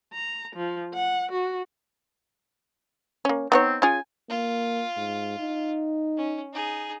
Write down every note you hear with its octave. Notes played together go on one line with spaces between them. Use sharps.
A#5
F3
F#5
F#4
A#3 C#4
B3 C4 D#4 C#5
C#4 F4 G#4 G#5
A#3 F4
G#2
D#4
C#4
D#4 G#4